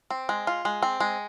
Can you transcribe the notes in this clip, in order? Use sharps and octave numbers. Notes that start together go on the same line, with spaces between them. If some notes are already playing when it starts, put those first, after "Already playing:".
C4
G#3
F4
G#3
C4
G#3